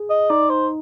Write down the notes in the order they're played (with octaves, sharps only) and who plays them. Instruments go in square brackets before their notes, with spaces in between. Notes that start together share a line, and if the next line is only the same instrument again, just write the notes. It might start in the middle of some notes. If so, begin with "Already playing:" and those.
Already playing: [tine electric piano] G#4
[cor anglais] D#5
[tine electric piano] D#4 [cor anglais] D5
[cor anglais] C5